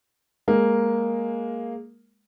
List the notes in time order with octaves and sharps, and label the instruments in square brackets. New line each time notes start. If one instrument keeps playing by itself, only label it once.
[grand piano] G#3 A#3